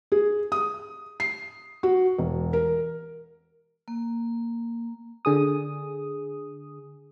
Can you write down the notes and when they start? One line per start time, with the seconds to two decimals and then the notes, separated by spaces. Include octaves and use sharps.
0.12 G#4
0.52 D#6
1.20 C7
1.83 F#4
2.18 E1
2.53 A#4
3.88 A#3
5.25 D3 G#4 D#6